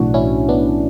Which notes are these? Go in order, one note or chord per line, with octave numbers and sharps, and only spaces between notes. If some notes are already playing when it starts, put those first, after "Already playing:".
Already playing: B1 A2 E3 D4 F#4
C#4 E4
B3 D4